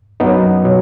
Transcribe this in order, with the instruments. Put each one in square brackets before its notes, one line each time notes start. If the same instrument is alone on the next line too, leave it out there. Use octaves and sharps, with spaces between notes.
[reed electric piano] F#2 F#3 B3 D#4
B2 F#3